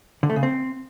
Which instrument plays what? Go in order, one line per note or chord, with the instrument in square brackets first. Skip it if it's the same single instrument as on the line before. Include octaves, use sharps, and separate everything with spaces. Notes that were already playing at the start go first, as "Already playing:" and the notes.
[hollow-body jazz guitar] D3
A3
C#3
C4